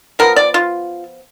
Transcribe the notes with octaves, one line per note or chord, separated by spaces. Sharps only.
F3 B3 A#4
D5
F4